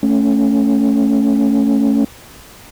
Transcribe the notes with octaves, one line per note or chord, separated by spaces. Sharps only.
A3 C#4